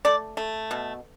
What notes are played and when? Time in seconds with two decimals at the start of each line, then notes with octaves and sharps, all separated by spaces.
0.05 A3 D5
0.37 A3
0.71 B2